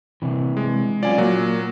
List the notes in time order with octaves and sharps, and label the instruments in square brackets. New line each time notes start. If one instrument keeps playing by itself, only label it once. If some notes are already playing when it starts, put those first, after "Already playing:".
[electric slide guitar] C3 E3
[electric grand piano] G#3
[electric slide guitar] F#3 C#4 F4 [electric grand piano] D5 G#5
[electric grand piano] A#2 F#3 [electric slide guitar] A#3